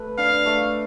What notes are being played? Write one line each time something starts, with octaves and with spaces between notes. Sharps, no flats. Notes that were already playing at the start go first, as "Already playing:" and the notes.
Already playing: A3 G4 B4
D4 F5
A3